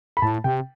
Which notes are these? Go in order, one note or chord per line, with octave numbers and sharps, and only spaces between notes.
B5
A2 A5
C3 G5